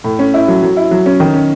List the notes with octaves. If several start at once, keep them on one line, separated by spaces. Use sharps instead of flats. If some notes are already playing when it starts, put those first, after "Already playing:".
A2
C#4
E4
F#3
F#3
E4
F#3
C#4
D#3
C#4